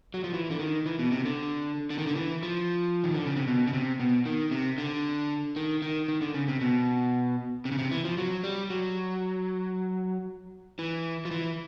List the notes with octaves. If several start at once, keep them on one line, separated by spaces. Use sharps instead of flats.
F#3
F3
E3
D3
D#3
E3
B2
C3
D3
D3
D#3
D3
E3
F3
D#3
D3
C#3
C3
B2
C#3
C3
B2
D#3
C3
D3
D#3
D#3
D#3
D3
C#3
C3
B2
C3
C#3
C3
E3
F3
F#3
G3
F#3
E3
F3
E3